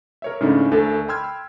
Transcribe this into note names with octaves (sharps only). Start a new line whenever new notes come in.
A#4 C#5 E5
G#2 C#3 A3 C#4 D4 E4
D2 A3 A4 A#4
G5 B5 C6 E6 F6 G#6